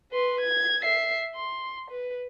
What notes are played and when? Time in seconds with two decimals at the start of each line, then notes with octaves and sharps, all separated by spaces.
0.12 B4 C6
0.41 G#6
0.82 E5 C7
1.35 C6
1.91 B4